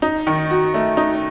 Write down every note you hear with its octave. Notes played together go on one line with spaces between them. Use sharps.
D#4
D#3
F#4
A3
D#4